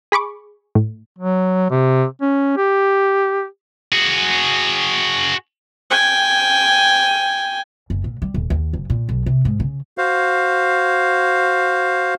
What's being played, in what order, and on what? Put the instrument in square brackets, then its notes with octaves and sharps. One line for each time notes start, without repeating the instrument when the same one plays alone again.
[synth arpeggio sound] G#4 B5 C#6 D6
A2
[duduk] F#3
C3
C#4
G4
[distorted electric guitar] F#4 G#4
[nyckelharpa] G5 G#5
[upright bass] F#1
A#2
G3
D#1
D#2
F#1
A#2
B1
C3
G#2
C#3
[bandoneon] F#4 C5 F5